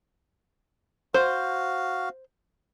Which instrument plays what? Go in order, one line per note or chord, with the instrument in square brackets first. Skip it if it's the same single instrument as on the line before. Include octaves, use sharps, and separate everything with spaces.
[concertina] F#4 F5 [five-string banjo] C5